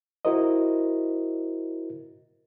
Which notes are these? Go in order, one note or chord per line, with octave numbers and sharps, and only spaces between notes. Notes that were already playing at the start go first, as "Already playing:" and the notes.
E4 F#4 A#4 C5 D#5